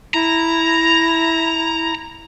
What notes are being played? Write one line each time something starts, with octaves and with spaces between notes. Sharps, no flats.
E4 A#5